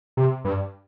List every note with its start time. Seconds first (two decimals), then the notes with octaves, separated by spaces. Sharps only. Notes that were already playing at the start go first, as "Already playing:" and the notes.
0.17 C3
0.45 G2